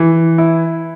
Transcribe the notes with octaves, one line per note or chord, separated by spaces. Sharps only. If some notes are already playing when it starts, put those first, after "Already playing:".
Already playing: E3
E4